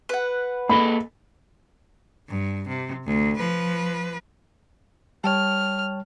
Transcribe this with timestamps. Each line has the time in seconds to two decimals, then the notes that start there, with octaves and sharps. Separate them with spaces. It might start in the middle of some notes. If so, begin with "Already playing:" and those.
0.09 B4 F#5
0.69 A#3 A4 D#5 B5
2.29 G2
2.68 C3
3.05 D2
3.37 F3 B4
5.24 G3 C#5 G5 A5 F6